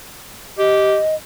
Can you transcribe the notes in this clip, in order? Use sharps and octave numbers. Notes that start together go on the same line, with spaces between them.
G4 D#5